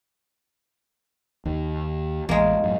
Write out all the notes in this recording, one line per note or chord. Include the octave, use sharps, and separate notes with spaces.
D#2 D#3
A1 E2 G#3 A#3
F#2 A2